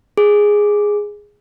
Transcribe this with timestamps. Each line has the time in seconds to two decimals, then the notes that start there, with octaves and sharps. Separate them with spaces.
0.17 G#4